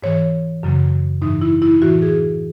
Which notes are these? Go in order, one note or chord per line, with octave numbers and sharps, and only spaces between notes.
G#2 E3 C#5
F#2 C#3 F#3
G#2 E3 D#4
E4
E4
A2 E3 F#4
G#4